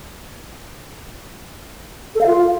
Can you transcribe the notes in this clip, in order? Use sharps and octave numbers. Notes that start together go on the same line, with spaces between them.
A4
F5
F4